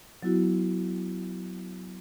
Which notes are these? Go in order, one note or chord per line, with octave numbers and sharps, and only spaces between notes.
F#3 B3 E4 F#4